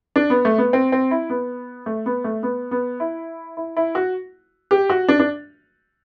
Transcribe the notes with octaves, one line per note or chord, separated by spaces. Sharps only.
D4
B3
A3
B3
C4
C4
E4
B3
A3
B3
A3
B3
B3
E4
E4
E4
F#4
G4
F#4
D4
D4